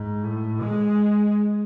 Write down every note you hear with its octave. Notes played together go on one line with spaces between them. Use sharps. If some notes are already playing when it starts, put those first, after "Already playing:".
Already playing: G#2
A2
G#3